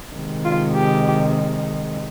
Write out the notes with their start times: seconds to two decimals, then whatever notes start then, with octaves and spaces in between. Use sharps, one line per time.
0.15 C3 D#3 G#3
0.45 F4
0.74 G4